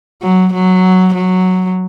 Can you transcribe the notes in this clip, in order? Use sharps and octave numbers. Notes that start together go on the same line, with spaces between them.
F#3
F#3
F#3